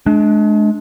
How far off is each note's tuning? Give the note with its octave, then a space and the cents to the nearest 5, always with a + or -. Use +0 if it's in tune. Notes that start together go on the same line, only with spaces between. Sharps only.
G#3 +35 D4 +0